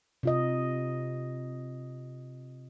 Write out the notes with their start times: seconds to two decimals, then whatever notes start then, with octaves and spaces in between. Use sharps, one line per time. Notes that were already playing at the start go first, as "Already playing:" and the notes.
0.23 C3 F4 D#5